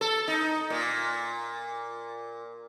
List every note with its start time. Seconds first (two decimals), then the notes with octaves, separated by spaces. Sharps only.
0.01 A4
0.28 D#4
0.70 A#2